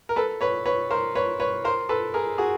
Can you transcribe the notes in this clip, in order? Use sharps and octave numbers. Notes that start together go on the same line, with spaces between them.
A#4
A4 B4
B4 C#5
B4 C#5
A#4 C5
B4 C#5
B4 C#5
A#4 C5
A4 B4
G#4 A#4
F#4 G#4